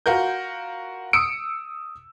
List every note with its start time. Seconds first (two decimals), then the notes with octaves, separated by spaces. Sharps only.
0.06 F4 F#4 A#4 G6
1.13 D#6 E6 C#7 D7